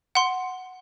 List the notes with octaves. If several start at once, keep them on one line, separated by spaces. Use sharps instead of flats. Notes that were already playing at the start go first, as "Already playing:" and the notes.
F#5 C6